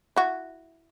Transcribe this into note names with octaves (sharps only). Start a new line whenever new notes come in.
E4 F#4